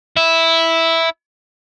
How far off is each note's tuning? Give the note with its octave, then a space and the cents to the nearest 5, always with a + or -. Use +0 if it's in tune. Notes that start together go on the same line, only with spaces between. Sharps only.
E4 -5